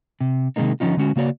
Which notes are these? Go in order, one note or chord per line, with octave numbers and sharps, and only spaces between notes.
C3
C3 D#3 G#3 A#3 D#4
D3 F3 C#4 D#4 F4
D3 G#3 C#4 F#4
C#3 A#3 F#4 C#5 D5